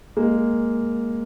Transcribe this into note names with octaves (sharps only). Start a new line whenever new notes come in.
G#3 A#3